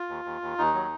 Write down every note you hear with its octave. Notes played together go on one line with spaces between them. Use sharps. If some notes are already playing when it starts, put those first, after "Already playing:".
Already playing: F4
D#2
D#2
D#2
D#2 D#4
F#3